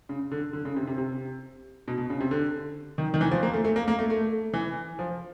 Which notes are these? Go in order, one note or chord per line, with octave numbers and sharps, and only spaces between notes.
C#3
D3
D3
C#3
C3
C3
C3
B2
B2
C#3
C3
D3
D#3
D#3
E3
F3
A#3
A3
A3
A#3
A#3
A3
A3
E3
F3